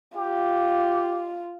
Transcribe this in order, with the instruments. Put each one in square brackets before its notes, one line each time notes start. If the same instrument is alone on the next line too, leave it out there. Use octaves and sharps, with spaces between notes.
[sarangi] F4 [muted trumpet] G4